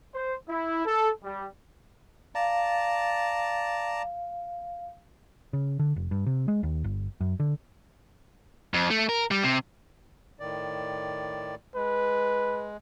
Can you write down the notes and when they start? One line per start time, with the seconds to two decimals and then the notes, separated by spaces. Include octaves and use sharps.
0.13 C5
0.48 E4
0.86 A4
1.23 G3
2.35 D5 F5 A5 A#5
5.53 C#3
5.80 D3
5.96 F1
6.11 G2
6.27 C3
6.48 G#3
6.63 D#2
6.84 G1
7.21 F#2
7.40 D3
8.74 F2
8.90 A3
9.09 A#4
9.31 G3
9.43 C3
10.40 A2 D#3 D5
11.75 G#3 B4